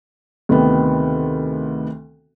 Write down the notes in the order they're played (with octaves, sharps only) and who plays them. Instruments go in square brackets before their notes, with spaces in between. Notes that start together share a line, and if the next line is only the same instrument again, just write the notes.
[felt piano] D2 C3 D#3 B3